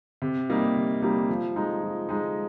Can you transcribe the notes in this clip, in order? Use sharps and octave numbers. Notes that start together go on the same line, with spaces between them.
C3
G3 A#3 D#4
C3
G3 A#3 D#4
F3
G#3 D#4
F3
G#3 D#4